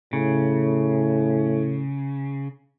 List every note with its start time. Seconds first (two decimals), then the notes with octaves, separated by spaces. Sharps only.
0.13 A2 C#3